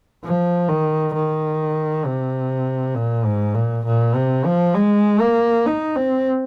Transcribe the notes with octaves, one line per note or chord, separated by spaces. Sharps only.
F3
D#3
D#3
C3
A#2
G#2
A#2
A#2
C3
F3
G#3
A#3
D#4
C4